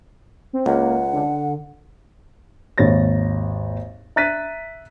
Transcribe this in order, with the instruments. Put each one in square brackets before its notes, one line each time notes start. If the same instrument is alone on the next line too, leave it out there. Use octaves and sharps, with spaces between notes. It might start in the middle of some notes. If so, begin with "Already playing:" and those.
[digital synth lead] C4
[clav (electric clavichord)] C#2 [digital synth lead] A#3 [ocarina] F#5
[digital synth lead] D3
[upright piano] G#1 D#2 C#5 A6 A#6
E5 A#5 F#6 A6 B6 D#7